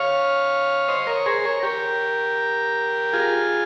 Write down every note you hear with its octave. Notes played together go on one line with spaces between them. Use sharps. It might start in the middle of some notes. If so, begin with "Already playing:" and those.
Already playing: C#5 F5
C5 D#5
A#4 C#5
G#4 C5
A#4 C#5
G4 A#4
F4 G#4